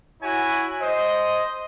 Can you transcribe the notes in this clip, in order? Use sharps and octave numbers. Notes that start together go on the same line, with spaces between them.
E4 F#4 C#5 G#5
C5 D#5